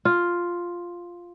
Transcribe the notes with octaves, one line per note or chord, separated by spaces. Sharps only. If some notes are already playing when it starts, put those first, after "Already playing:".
F4